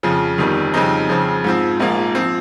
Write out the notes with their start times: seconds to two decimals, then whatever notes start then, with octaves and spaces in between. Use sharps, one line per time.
0.03 F2 C#3 F3
0.38 G1 F2 D#3 G3
0.74 F2 C#3 G3 C4 D#4
1.09 F2 C#3 F3 C4
1.44 G#2 F3 C4
1.80 A#1 G#2 F3 A#3
2.15 F3 C4